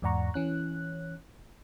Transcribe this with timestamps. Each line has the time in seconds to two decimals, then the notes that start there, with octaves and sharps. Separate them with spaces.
0.02 E2 G#2 D5 F#5 A#5 C#6
0.34 E3 C#4 F#6